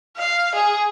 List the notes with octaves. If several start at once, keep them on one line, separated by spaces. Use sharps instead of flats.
F5
G#4